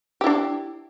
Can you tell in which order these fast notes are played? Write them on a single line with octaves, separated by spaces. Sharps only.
G4 E4 D4